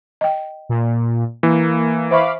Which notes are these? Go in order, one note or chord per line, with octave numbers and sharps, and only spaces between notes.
D#5 G5
A#2
E3 A#3
C5 E5 F5 B5 C#6 D6